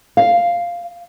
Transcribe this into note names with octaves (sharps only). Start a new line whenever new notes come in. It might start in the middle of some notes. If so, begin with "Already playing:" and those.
F5